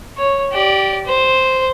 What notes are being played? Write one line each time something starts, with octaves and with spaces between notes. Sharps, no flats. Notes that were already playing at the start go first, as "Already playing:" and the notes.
C#5
G4 D5
C5